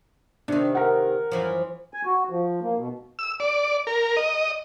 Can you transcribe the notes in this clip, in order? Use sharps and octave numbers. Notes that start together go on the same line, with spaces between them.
C3 D#3 D4
A#4 F#5
F#2 E3 F3
G#5
F#4
F3
A#3
B2
E6
D5
A#4
D#5